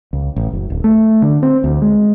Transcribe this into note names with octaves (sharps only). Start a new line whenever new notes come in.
C#2
A1
F#1
D1
A3
D3
C4
D2
G#3